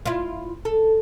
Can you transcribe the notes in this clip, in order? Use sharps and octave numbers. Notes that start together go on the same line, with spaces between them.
E4 F4
A4